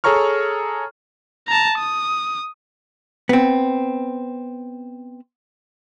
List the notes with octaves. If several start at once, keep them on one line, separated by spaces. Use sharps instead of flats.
G#4 A4 C#5 A#5 C#6 F6
A5 A#5
D#6
B3 C4